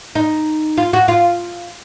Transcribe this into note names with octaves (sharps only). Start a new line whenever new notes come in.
D#4
F4
F#4
F4